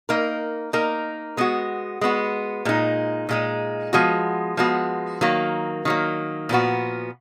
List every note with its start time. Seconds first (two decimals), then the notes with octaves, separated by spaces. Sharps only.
0.09 A#3 D#4 A#4
0.73 A#3 D#4 A#4
1.37 G#3 B3 F#4
2.01 G#3 B3 F#4
2.65 A#2 G#3 D#4
3.29 A#2 G#3 D#4
3.93 F3 G#3 B3 F#4
4.57 F3 G#3 B3 F#4
5.21 D#3 F#3 A#3
5.85 D#3 F#3 A#3
6.49 A#2 F3 B3 F#4